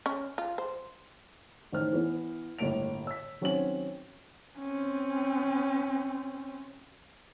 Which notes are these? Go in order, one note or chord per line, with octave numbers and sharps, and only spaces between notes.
C#4
F4
C5
A1 D#3 C5 F6
E3 B3
G1 A2 A#3 D7 F7
E6 B6
D#3 F#3 C4 C#4 C#5 F#7
C4 C#4